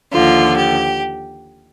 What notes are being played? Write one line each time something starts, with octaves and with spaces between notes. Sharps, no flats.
D#2 D3 F3 F4
G4